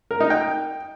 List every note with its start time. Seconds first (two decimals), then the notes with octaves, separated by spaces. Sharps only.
0.11 A#4
0.20 D#4
0.30 G5